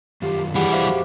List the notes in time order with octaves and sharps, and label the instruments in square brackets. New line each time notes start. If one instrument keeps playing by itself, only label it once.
[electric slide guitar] F#2 D#3 F4 [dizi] G4
[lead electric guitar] E3 G3 [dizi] G4 [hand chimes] G#4 F#5 B5
[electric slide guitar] F2 F#4 E5 [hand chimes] C5 F5 D6